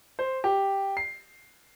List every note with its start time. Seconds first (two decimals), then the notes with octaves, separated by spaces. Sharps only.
0.19 C5
0.44 G4
0.97 C7